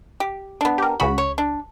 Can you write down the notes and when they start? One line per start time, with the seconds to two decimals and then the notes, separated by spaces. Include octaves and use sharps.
0.20 G4
0.61 B3 D4
0.78 G4 A#4
1.00 C#2 C#3 F#4 B5
1.18 C#5
1.38 D4